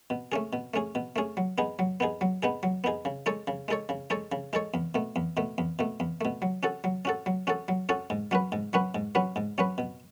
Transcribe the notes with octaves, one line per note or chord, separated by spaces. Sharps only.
B2
A3 C#4 G#4
B2
A3 C#4 G#4
B2
A3 C#4 G#4
F#3
B3 D#4 G#4
F#3
B3 D#4 G#4
F#3
B3 D#4 G#4
F#3
B3 D#4 G#4
C#3
G#3 D#4 A4 C#5
C#3
G#3 D#4 A4 C#5
C#3
G#3 D#4 A4 C#5
C#3
G#3 D#4 A4 C#5
E2
B2 A3
E2
B2 A3
E2
B2 A3
E2
B2 A3
F#3
C#4 F#4 A4
F#3
C#4 F#4 A4
F#3
C#4 F#4 A4
F#3
C#4 F#4 A4
G#2
F#3 C#4 F#4 B4
G#2
F#3 C#4 F#4 B4
G#2
F#3 C#4 F#4 B4
G#2
F#3 C#4 F#4 B4
B2